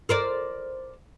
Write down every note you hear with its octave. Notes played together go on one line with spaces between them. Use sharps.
A#4 C5 D5